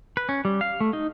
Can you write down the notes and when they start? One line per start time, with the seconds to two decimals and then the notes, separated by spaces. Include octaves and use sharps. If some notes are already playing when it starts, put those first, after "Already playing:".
0.17 B4
0.29 C#4
0.45 G3
0.61 F5
0.80 A3
0.93 D#4